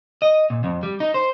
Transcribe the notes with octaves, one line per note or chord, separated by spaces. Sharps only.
D#5
A#2
F2
G3
D#4
C5